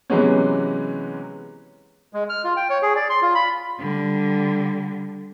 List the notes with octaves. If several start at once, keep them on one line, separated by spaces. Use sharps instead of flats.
C3 E3 F#3 G#3 B3 C#4
G#3
F6
F4
G5
C#5
G#4
D5
C6
F4
B5
D3 G3